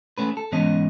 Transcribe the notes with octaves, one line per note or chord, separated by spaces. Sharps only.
A3 C#4 B4
A4
G#2 E3 B3 C#4 C#5 D#5